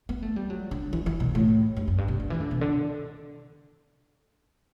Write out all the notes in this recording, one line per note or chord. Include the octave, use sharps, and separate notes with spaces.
B3
A3
G3
F#3
D3
E3
E3
B2
A2
G2
F#2
G2
B2
D3
E3
D3
B2
D3